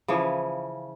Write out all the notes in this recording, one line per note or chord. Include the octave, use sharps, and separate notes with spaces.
C#3 E3 F3 C#4